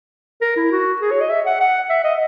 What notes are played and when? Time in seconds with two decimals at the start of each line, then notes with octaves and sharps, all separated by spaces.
0.41 A#4
0.56 E4
0.71 F#4
1.01 G#4
1.11 C#5
1.21 D#5
1.30 E5
1.45 F#5
1.60 F#5
1.90 E5
2.04 D#5